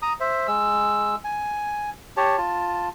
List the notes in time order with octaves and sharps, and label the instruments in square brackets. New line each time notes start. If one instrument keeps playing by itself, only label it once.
[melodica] A#5 D#6
C5 E5
G#3 E6
G#5
G4 C#5 A5
F4 A5